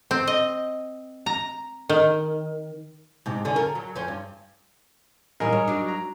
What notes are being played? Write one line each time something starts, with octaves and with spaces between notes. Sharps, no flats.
C4
D#5
A#5
D#3
G#2 C3
F#2 D3 C#4
A#4
F#3
F2 C#4 C5
G2
A#2 E3 G3 D#4 G#4 A#4
C#5
F#3 D4
A#5